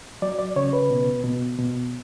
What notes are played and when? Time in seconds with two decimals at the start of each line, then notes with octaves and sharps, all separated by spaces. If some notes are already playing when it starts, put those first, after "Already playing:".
0.22 F#3 D5
0.39 D5
0.56 C#3 C#5
0.73 B4
0.91 B2
1.24 B2
1.58 B2